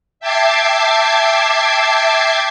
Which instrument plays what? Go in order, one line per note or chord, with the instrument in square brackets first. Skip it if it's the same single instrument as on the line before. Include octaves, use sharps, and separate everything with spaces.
[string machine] E5 G5 A5 D6 G#6 C7